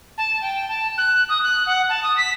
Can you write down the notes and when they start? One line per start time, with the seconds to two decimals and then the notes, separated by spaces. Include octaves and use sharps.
0.18 A5
0.42 G5
0.68 A5
0.98 F#6
1.29 D#6
1.44 F#6
1.66 F#5
1.89 A5
2.03 D#6
2.17 B6